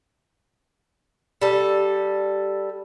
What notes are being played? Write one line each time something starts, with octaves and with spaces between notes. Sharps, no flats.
G3 A4